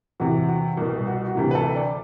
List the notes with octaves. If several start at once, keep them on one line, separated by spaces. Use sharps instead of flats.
E2 C3 E3 F#4
F#4
C2 B2
F#4
F#4
D2 C3 E3 G4
B4
A4
D5